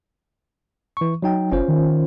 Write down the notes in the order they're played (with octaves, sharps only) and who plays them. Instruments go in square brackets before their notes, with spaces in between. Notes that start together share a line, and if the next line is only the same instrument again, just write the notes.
[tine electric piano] E3 C#6
F#3 D#4 G5
[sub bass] F#1 [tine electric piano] C#4 F4 C5
[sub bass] D#3